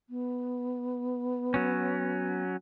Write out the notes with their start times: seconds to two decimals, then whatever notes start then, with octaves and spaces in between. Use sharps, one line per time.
0.10 B3
1.54 F#3 C#4